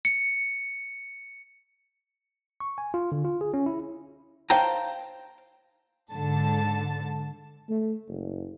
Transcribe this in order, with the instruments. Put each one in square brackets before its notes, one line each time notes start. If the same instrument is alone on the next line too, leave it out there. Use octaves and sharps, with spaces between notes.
[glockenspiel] C#7
[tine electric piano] C#6
G#5
F4
D3
F4
G#4
C#4
E4
[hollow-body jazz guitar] C5 F5 G5 A5 A#5
[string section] G#2 D3 A5
[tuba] A3
F#1